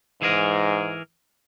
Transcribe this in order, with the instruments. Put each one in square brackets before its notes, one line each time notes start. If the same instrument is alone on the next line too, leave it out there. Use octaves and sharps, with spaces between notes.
[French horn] G#2 [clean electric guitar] E3 G#4 A#4